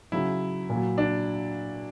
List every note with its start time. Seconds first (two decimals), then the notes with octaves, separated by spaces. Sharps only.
0.12 C#3 F#3 E4
0.70 A#2 F#3
0.98 D4